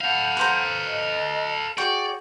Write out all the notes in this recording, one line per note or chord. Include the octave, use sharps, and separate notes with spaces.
A4 F5 F#5 B5 G6
B4 C5 A#5
D#5
F#4 G#4 D5 G5 C#6